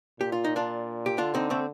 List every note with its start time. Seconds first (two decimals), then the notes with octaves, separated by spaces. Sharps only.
0.20 A#2 G4
0.32 F4
0.44 D#4
0.56 D4 F4
1.06 G4
1.18 D3 D4 F4
1.35 C4 D#4
1.50 A3 C4